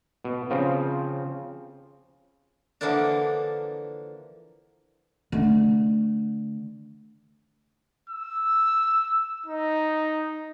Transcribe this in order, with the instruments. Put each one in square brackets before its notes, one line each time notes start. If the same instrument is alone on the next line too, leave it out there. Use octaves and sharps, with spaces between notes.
[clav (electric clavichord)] B2
C#3 F3 C4
[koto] D3 E3 F3 A#3 D4
[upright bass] D3 A3
[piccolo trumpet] E6
D#4